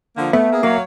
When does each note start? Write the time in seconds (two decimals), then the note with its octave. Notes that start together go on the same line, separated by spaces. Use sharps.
0.17 D3 F3 A#3
0.33 A3 B3 E5
0.51 A#3 G#4
0.63 F#3 A#3 C#5 F5